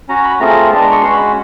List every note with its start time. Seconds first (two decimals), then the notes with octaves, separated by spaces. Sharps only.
0.09 C#4 F#4 A#5
0.24 B5
0.40 A3 C4 F4 G#4 A#5
0.71 G#3 B3 D4 A5
0.81 A#5
0.91 C#6
1.01 G#3 C#4 F#4 C6
1.13 B5